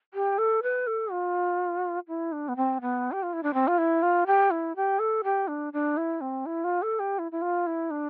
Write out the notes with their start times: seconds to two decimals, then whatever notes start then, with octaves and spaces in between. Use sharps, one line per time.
0.14 G4
0.38 A4
0.63 B4
0.87 A4
1.12 F4
2.08 E4
2.32 D4
2.48 B3
2.56 C4
2.81 B3
3.12 G4
3.23 F4
3.33 E4
3.43 D4
3.54 C4
3.67 F4
3.78 E4
4.02 F4
4.27 G4
4.51 E4
4.76 G4
4.99 A4
5.24 G4
5.48 D4
5.73 D4
5.97 E4
6.21 C4
6.46 E4
6.64 F4
6.82 A4
6.99 G4
7.19 E4
7.32 E4
7.42 F4
7.67 E4
7.91 D4